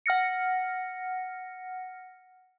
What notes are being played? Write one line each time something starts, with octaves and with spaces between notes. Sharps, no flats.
F#5 F6 A#6 C#7